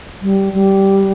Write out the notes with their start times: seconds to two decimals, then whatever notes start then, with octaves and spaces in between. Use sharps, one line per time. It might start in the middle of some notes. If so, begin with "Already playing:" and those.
0.22 G3
0.53 G3